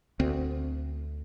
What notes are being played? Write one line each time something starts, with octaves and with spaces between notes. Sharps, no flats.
D2 C4